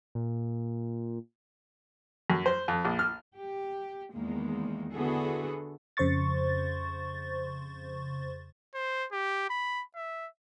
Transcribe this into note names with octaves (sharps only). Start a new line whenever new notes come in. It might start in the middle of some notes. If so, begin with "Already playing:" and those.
A#2
F#2
C5
F2
A#1
F6
G4
E2 D#3 G#3 A#3
D3 B3 E4 F#4 G#4 A4
F2 C#3 C5 C6 C#6 A6
C5
G4
B5
E5